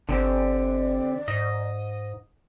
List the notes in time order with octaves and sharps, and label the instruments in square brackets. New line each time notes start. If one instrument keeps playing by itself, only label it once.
[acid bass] G1 [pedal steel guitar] D3 C4 G4 [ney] D5
[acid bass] G#2 [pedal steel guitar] D#5